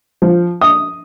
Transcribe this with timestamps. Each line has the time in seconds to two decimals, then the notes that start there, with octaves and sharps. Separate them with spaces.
0.22 F3
0.61 D#6